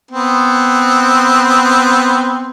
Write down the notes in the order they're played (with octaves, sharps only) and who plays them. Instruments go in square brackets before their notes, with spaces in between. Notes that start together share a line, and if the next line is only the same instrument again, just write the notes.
[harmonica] B3 C4